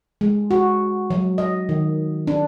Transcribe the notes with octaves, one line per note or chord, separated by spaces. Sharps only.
G#3
F#4
F#3
D#5
D#3
D4